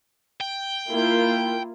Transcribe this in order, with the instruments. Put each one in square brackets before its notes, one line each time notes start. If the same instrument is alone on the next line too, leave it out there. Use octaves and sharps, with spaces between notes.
[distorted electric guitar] G5
[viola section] A#3 E4 F4